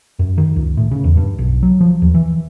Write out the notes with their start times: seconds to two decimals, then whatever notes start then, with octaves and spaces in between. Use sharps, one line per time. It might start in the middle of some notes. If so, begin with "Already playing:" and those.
0.19 F#2
0.38 D#3
0.56 C#2
0.77 A2
0.91 C#3
1.04 E2
1.17 G2
1.38 B1
1.63 F#3
1.81 F3
2.02 D#2
2.14 E3